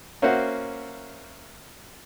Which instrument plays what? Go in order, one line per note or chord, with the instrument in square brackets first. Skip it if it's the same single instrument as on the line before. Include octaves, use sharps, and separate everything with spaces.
[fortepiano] A#3 C#4 F#4 C5 E5 F#5